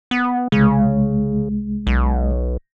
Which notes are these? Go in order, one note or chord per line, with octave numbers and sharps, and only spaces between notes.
B3
C2 C#3 G#3
B1